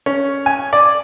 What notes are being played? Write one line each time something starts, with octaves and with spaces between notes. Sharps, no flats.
C#4
G#5
D5